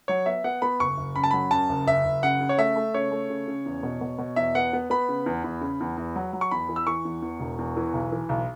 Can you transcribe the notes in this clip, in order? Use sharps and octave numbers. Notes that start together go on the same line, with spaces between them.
F#3 C#5
B3 E5
B3 F#5
B3 B5
F#1 C#6
F#1
F#2 B5
A5
F#3 B5
F#2 A5
F#1
F#1 E5
F#1
C#3 F#5
C#3
C#5
A3 E5
A3
C#3 C#5
A3
C#3
C#3
E2
B2
B2
B2
E2 E5
B3 F#5
B3
B3 B5
C#3
E2
E2
C#3
E2
E2
F#3
F#3
C#6
E2 B5
E3
E6
E3 C#6
E2
E2
E1
E2
E3
B1
E3
B1